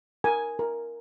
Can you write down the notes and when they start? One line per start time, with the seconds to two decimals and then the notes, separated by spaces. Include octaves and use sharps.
0.24 A#4 G#5
0.59 A#4